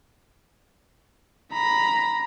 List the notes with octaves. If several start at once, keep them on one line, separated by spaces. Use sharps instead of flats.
A#5 B5